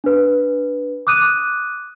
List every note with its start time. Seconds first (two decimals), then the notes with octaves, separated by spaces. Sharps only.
0.04 D4 B4
1.07 D6 D#6 F#6 D#7